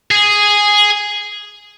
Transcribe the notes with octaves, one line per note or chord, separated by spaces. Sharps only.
G#4